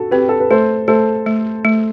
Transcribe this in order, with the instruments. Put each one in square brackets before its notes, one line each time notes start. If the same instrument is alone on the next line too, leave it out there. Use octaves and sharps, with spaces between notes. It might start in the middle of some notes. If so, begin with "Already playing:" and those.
Already playing: [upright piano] F#4 A4
[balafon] C4 [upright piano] G4 B4
[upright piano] A4
B4
[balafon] A3 [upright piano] A4 C5
[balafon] A3 [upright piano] A4 C5
[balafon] A3
A3